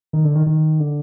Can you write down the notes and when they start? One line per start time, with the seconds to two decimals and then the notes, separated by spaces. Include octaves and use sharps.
0.13 D#3
0.24 D3
0.35 D#3
0.47 D#3
0.80 D3